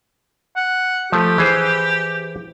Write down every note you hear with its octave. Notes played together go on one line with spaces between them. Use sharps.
F#5
F3 A3 G4
E3 G#4 C5